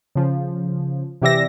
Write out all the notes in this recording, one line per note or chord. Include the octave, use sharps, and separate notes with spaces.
C#3 F3
C3 E3 G4 D5 E5 A#6